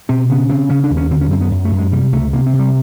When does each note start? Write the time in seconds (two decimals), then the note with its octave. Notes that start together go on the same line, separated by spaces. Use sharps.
0.09 B2 C4
0.30 C#3 B3
0.50 C#3 C4
0.69 C#3 C#4
0.84 D4
0.90 D#2
0.97 C#4
1.11 D3 C4
1.21 C#4
1.31 F#2 C4
1.41 B3
1.51 F#2
1.65 A3
1.72 F#2
1.78 G#3
1.92 C3 G3
2.13 C#2 A3
2.33 C3 A#3
2.46 C4
2.53 C3
2.59 G3